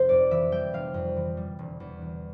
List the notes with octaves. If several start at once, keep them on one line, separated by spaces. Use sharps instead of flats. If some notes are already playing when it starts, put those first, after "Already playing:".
Already playing: F1 C5
F2 D5
E3 E5
G3 G5
F1 F5
F2
E3
G3
E1
E2
E3